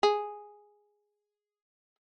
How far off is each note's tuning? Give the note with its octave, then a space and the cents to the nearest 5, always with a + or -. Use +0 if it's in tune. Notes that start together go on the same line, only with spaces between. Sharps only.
G#4 +0